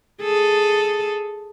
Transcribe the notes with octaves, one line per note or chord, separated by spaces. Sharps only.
G#4 A4